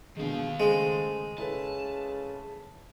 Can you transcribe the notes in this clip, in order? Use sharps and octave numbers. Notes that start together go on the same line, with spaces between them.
B2 D3 D#3 G#3 F5
C#3 G#3 A3 C5
C#3 E4 A4 B4 A5